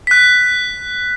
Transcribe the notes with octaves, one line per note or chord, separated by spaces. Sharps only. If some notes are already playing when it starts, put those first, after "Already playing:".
F#6 B6